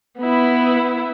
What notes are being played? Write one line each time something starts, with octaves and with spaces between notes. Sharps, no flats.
B3 E4